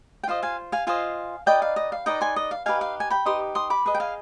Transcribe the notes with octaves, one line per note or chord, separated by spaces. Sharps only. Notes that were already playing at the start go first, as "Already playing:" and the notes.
G5
F4 C5 D#5 F5
F5 G#5
F5 G#5
F4 C5 D#5 F5 G#5
D#4 B4 D5 D#5 G5
F5
D#5
F5
D#4 B4 D5 D#5 G5
G#5 C6
D#5
F5
D#4 G4 B4 F5 G#5
F5
G#5
G5 B5
D#4 G4 B4 C6 D#6
C6 D#6
B5 D6
G#4 B4 D#5
G5
F5 G#5